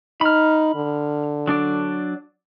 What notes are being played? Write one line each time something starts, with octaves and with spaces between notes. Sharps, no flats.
D#4 B5 F6
D3
F#3 D4 D5